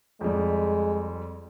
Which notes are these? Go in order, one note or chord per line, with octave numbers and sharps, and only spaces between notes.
F2 G3 G#3